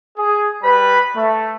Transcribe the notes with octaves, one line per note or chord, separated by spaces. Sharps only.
G#4
G3 B4 B5
A3